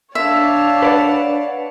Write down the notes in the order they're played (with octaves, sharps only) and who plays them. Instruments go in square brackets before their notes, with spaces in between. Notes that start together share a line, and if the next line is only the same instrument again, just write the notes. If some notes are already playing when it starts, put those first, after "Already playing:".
[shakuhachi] D4 [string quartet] C#5 F5 A5 [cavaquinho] E5
[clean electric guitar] B4 D5 F#5